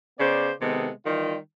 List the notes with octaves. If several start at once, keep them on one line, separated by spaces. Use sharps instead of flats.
C#3 B3 C5 D5
C3 D#3 G#3 B3 A4
D#3 E3 G3 D#4 F4